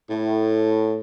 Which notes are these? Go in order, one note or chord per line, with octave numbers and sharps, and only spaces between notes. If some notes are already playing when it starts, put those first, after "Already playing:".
A2